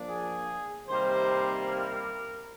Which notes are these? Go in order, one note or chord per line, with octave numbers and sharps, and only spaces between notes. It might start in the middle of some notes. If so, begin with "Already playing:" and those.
Already playing: F3 A#3 D4
G#4
C3 D#3 G3 A#3 C5
A#4